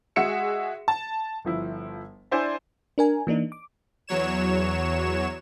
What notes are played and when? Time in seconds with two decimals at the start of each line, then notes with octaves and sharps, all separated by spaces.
0.16 G#3 F#4 G#4 E5 C#7 E7
0.88 A5
1.45 G1 F3 E4
2.31 D4 E4 C5 D5 G#5
2.98 D4 A#4 G#5
3.27 E3 A#3 D4 D#4
3.52 D6
4.07 E2 F#3 C#5 E7